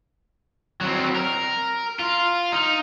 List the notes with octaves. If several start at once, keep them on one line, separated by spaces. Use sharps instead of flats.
F#3 C4
A#4
F4
D#4